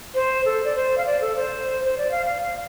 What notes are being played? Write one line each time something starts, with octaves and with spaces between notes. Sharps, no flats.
C5
A4
D5
C5
F5
D5
A4
C5
C5
D5
F5
F5
F5